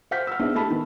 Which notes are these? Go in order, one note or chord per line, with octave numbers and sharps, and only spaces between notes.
C5 F#5 F6 G6 B6
E6 F6
B3 C4 D4 D#4 G#4 E5
A3 E4 G4 A5 B5
D#3 E3 B3